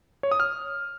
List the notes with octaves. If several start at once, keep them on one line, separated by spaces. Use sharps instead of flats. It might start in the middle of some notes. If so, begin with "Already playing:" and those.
C#5
D#6
F6